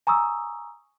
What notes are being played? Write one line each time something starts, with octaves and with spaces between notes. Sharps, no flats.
G#5 A#5 C#6 D#6 E6